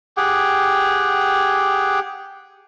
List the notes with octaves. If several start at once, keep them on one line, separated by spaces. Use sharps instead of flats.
G4 G#4 F#5 G5